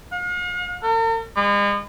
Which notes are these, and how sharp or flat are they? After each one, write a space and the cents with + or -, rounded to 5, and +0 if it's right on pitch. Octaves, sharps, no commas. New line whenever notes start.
F5 +45
A#4 -45
G#3 -40